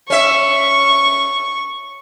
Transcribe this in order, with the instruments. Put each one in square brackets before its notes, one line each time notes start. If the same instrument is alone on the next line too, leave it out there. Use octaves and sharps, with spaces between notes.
[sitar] C#4 E5 [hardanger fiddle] C#6